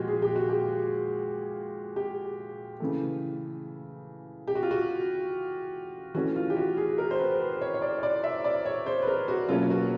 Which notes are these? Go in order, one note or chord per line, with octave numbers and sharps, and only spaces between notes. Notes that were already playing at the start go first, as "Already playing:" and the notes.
Already playing: A#2 F3 G#3 F#4 G4
G#4
G4
F#4
G4
G4
C#3 E3 A3
G4
F#4
F4
F#4
E3 A3 C#4 F#4
F4
G4
F#4
G#4
A#4
C5
B4
B4
C#5
C#5
D5
C#5
D5
E5
D5
C#5
C5
B4
A#4
F#4
B2 F#3 A#3 C#4 F4
F#4